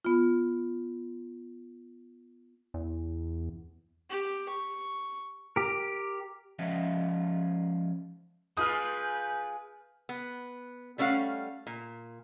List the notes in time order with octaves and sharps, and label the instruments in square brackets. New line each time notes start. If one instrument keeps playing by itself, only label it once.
[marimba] B3 F4
[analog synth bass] E2
[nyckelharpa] G4
C#6
[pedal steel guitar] G4 A#4
[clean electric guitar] F3 G#3 C#4 F4 D#5 E5
[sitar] G#3 F4 [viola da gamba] B4 [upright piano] D#6 F6 [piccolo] G6
[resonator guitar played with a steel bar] B3
G3 A3 C#4 A4 F5 F#5
A#2